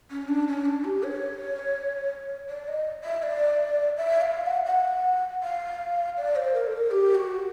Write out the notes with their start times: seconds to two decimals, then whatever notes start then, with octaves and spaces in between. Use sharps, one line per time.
0.11 C#4
0.28 D4
0.48 C#4
0.65 D4
0.84 G4
1.03 C#5
2.50 D5
2.68 D#5
3.04 E5
3.23 D5
3.97 E5
4.21 F5
4.46 F#5
4.66 F#5
5.43 F5
6.17 D5
6.36 C5
6.54 A#4
6.67 A4
6.73 A#4
6.91 G4
7.15 F#4